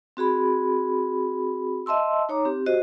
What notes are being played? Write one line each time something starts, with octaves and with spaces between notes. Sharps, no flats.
C4 F#4 G#4 B5
D#5 E5 A5 C6 E6
D#4 C#5 A#5 D6
C4 G4
F#4 G4 C5 D#5